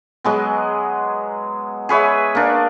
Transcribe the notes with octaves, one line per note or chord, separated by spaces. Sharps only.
F#3 G#3 B3
G#4 B4 C#5 E5
A#3 D4